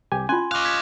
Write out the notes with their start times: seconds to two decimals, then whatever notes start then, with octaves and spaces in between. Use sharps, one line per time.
0.12 C2 G4 G#5
0.29 C#4 F4 G#5 C6
0.52 D#5 F5 C#6 D6 F#6
0.65 G#6 B6